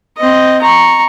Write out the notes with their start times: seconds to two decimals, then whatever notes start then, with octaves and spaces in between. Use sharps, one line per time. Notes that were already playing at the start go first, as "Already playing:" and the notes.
0.18 C4 D#5
0.61 A#5 C#6